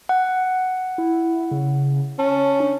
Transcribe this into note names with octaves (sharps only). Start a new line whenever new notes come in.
F#5
E4
C#3
C#4 A5
D4